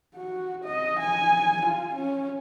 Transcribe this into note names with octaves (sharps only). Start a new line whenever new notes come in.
F#4
D#5
G#5
F4
C#4